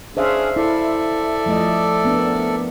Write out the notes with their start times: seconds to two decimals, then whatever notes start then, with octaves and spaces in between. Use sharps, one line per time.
0.17 C#4 D4 G#4 C5 E5 F5
0.56 E4 A4 D5 E5
1.46 F3 A3 D#5
2.05 B3 C4 D4
2.17 A#4